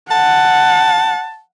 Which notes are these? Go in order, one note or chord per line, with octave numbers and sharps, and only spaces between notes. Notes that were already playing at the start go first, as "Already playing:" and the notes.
F#5 A5